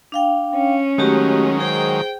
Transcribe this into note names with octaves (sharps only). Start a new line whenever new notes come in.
D4 F5 G5
C#4
D#3 F#3 G#3 A3 F#4 G4
G#4 C5 G5